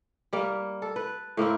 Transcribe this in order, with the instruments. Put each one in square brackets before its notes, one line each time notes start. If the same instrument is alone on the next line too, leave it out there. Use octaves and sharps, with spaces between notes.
[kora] G3 A#3
A4
B4
A2 A#3 C4 E4